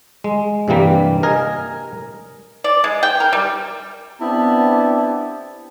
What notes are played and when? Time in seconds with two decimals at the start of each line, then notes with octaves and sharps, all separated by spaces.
0.24 G#3
0.68 G2 C3 E3 G3 A#3
1.23 A#4 D#5 G#5
2.64 D5
2.84 G#3
3.03 G5
3.20 A#4
3.33 G3
4.21 B3 C4 D4 E4 G4 A5